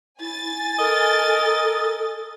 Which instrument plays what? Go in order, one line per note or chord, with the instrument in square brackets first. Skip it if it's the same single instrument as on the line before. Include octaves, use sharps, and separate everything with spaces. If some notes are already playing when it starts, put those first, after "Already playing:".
[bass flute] E4 [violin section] G#5 A6
[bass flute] A4 [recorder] A#4 [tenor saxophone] D#5